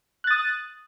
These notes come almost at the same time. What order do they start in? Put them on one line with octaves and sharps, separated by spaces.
F#6 A6 D#6